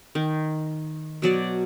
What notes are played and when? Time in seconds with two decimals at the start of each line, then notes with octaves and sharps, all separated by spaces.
0.15 D#3
1.22 B2 F#3 D5